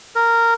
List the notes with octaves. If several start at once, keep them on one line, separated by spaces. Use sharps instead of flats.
A#4